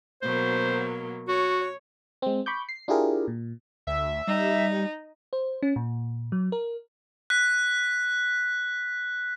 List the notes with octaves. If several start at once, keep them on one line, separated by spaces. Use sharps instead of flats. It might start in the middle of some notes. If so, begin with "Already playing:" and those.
B2 F#3 A#3 C5
F#4 C#5
G#3 C4
B5 C#6 D6 G6
C7
D4 E4 F4 G4 G#4 A#4
A#2
D2 E5
G3 D#4
C5
C#4
A#2
F#3
A#4
F#6 B6